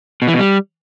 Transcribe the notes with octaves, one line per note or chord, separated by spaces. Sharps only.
B2
E3
B2
G3